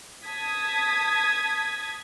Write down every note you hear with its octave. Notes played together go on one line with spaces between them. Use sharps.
A5 D#6 G#6 B6